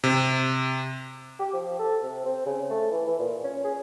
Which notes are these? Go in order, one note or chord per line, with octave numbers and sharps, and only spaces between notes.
C3
G4
F3
A4
C3
C4
C#3
A3
E3
E3
A#2
C#4
G#4